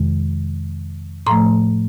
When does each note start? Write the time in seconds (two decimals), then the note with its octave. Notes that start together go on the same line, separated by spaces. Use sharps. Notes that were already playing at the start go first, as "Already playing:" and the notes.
Already playing: F2 C3 D#3 G#3
1.26 A2 F3 A3 A#5 C6